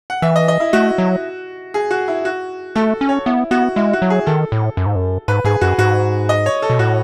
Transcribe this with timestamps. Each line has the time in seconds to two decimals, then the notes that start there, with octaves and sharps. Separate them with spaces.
0.10 F#5
0.22 E3 E5
0.36 D#5
0.48 D#5
0.60 E4
0.73 A3 F#4
0.98 F#3
1.74 G#4
1.91 F#4
2.08 E4
2.25 F#4
2.75 A3 A4
3.01 C#4
3.09 C#5
3.26 B3 E4
3.51 B3 F#4
3.76 G#3 E4
3.93 F#4
4.02 F#3
4.10 G#4
4.26 D#3 A4
4.52 A2
4.77 F#2
4.86 G#2
4.95 F#2
5.28 G#2 B4
5.45 G#2 G#4
5.61 F#2 F#4
5.78 G#2 F#4
6.29 D#5
6.46 C#5
6.62 A4
6.70 B2
6.79 A2 F#4